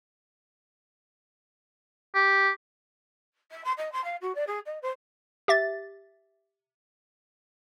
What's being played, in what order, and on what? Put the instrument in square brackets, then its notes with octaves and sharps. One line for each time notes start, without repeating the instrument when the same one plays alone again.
[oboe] G4
[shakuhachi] E5
C6
D#5
C6
F5
F#4
D5
G#4
D#5
C5
[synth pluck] G4 E5 A6